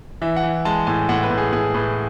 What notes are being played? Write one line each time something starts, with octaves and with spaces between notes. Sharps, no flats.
E3 E5
F#5
E3
G#3 A5
A2 G#5
A2 F#5
B4
A2
G#4
A2 G#4
A2 B4